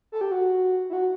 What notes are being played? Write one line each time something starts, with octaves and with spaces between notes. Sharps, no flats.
A4
G4
F#4
E4
F#4